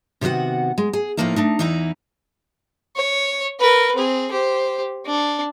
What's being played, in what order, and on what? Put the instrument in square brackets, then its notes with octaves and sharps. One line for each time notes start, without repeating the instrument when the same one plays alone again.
[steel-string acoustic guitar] C3 D#3 B3 F#4 F#5
G#3
G#4
A2 F3 G#3 A#3 D#4 E4
A3 D4 D#4
E2 E3 D#4 E4 A#5
[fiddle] C#5
A#4 B4
C4 G#4
G4 C5
D4